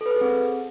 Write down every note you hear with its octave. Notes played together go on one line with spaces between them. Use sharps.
A4
B4
A4
G#4
C4